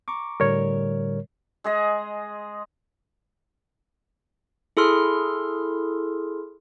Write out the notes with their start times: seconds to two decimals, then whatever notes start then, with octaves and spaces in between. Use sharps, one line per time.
0.08 A#5 C#6 D6
0.40 A2 D3 G3 A#4 C#5
1.64 G#3 G#4 D#5
4.77 E4 G#4 A4 C6 F6